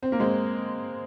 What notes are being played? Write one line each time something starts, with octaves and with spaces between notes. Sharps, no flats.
C4
A#3
G#3 C4